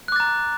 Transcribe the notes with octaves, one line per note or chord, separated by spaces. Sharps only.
A#5 D6 F#6 A6